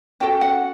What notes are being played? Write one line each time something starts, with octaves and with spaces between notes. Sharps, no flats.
C#4 F#4 A4 G5
F#5